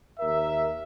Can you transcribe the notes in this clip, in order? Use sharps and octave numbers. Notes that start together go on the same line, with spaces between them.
D#2 A#4 E5